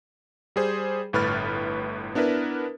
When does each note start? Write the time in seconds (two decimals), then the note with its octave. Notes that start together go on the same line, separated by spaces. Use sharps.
0.56 G3 G#4 C5
1.13 G1 A2 B4 B5 F6 A6
2.15 B3 D4 E4 A#4 B4